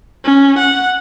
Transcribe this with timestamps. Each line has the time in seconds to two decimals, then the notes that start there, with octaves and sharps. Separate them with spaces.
0.24 C#4
0.58 F#5